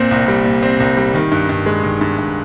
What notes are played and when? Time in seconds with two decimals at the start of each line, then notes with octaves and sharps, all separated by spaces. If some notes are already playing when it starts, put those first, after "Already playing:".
Already playing: A#2 C4
0.11 C2
0.28 G3
0.45 A#2
0.63 C4
0.80 C2
0.97 G3
1.14 D#3
1.32 G2
1.49 G2
1.66 G#3
1.83 D#3
2.01 G2
2.18 G2